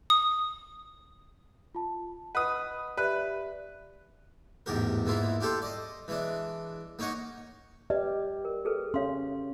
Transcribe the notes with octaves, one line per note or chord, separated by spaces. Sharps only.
D#6
F4 A5
B4 D#5 F#5 D#6
G4 B4 D5 E5 F#6
A1 E2 G#2 G4 A#4
G#2 E3 A#3 E4 F4
D4 F4 G4 A4 C5
D5 D#5
E3 G#3 D4
A#3 D#4 C#5 D#5 F#5
G4 B4 D5 D#5
A#4
G#4 A4 B4
C#4 C#5 F5 C6